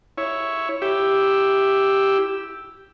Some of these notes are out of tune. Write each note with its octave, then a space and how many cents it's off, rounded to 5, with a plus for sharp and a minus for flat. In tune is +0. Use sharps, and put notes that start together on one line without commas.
E4 +0 C#5 +0
E4 +0 G4 +0 E5 +0